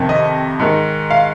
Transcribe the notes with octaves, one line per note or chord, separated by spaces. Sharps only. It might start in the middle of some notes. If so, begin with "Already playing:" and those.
Already playing: F2 C3 D#3
D#5
G#2 D#3
F5